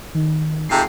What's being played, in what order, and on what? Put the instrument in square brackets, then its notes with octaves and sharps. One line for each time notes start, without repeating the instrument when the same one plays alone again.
[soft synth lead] D#3
[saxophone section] F2 G#2 C3 [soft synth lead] C7